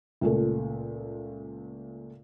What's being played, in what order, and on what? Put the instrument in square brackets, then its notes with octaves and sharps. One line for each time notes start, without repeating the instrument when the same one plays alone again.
[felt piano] C#2 A#2 A3